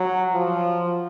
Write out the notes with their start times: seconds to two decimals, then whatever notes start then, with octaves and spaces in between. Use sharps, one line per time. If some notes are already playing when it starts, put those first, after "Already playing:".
Already playing: F#3
0.32 F3